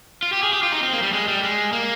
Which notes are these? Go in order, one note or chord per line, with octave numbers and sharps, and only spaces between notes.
F4
G4
G#4
G4
F4
D#4
C4
A#3
G3
G#3
G3
G#3
A#3